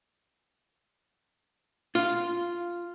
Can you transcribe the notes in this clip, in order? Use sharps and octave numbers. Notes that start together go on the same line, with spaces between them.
F4